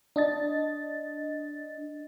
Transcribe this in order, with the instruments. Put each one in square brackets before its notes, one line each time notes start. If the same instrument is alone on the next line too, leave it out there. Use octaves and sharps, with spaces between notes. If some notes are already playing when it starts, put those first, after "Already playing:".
[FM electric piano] D4 D#5 A6